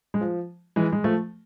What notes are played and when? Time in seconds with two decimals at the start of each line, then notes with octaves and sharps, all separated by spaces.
0.14 G#3
0.21 F3
0.76 E3 G#3
0.92 G#3
1.04 F3 A3